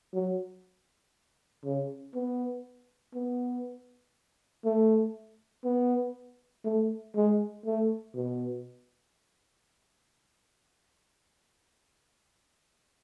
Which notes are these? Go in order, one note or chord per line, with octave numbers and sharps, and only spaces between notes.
F#3
C#3
B3
B3
A3
B3
A3
G#3
A3
B2